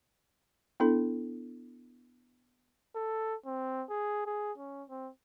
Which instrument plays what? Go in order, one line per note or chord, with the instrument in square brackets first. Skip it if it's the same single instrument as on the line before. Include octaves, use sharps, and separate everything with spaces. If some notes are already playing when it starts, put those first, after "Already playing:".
[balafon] B3 D4 E4 A4
[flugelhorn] A4
C4
G#4
G#4
C#4
C4